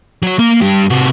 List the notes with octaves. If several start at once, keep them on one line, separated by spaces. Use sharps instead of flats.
F#3 C#5
A#3 F5
G2 G4
C3 F#4